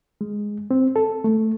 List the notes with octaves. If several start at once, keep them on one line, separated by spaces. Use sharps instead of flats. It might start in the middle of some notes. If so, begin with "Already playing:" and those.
G#3
C4
A4
A3